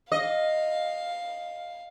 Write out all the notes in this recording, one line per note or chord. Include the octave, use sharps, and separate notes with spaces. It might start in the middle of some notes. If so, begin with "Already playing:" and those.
D#5 F5